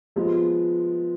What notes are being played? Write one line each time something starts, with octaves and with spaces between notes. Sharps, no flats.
F3 G#3 B3